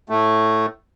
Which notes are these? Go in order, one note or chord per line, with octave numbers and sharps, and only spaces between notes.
A2 A3